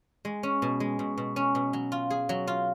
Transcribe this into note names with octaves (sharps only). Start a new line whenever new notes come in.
G#3
C#4
B2
G#3
B2
B2
C#4
B2
F#3
F4
G#4
F#3
F4